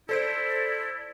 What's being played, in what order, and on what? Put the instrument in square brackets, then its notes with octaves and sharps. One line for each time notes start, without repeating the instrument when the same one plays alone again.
[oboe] E4 [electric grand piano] A4 C5 D7 [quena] D5